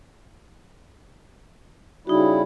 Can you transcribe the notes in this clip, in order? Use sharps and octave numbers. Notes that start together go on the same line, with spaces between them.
C#3 G3 D#4 E4 F#4